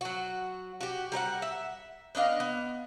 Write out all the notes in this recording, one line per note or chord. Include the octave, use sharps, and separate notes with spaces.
F#3 F#4
F#4 G4
G3 A#4 D5 F#5
E5
B3 D4 D#5 F5
B3